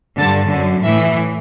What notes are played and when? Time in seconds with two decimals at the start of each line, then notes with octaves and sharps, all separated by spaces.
0.19 G2 D3 A5
0.52 F#2 D3
0.84 A2 E3 E5